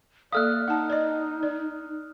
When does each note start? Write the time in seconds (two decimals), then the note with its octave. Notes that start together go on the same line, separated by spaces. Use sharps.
0.33 A#3 A4 D5 F5 D#6 F6 F#6
0.68 D#4 F#5 A5
0.90 D5 D#5
1.43 D5